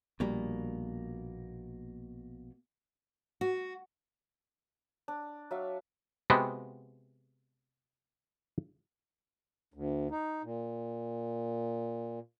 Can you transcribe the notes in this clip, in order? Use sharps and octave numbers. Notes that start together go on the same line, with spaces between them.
A#1 B2 G3 A#3
F#4
D4
F#3 E5 F5
C3 G#3 B3 F#4 G5
D2
D#4
A#2